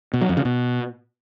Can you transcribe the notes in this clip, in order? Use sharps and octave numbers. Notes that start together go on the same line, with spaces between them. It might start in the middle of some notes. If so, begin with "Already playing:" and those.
B2
F#3
F2
C#3
B2